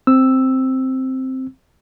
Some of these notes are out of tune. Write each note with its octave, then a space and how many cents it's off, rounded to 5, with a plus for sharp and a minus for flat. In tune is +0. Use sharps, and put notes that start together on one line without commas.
C4 +0 E6 +0